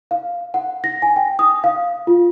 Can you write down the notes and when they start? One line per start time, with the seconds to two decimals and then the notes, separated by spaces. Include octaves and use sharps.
0.11 F5
0.54 F#5
0.84 A#6
1.02 G#5
1.16 G5
1.39 D#6
1.64 F5
2.07 F4